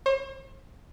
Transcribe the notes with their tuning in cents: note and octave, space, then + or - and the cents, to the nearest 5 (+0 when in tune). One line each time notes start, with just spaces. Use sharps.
C5 +45